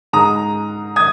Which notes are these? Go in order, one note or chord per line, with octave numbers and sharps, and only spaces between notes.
G#2 G#3 A#5 D#6
D#6 G#6